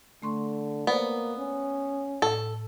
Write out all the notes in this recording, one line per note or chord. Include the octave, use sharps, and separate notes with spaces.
D3 A3 C6 C#6
A#3 B3 C5 D5
C#4
A2 A4